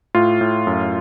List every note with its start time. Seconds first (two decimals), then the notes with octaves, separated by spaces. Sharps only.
0.15 A2 F4
0.41 A2
0.67 F#2